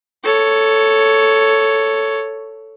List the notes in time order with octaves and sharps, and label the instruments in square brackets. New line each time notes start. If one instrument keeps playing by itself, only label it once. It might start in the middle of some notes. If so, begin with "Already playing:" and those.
[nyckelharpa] A4 C#5